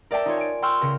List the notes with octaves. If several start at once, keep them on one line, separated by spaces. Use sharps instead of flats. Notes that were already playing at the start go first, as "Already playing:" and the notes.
A#4 D5 E5 G5 A5
D#4 F4 C#5
G#5 D7
G5 C6 C#6 E6 F6
C#3 A#4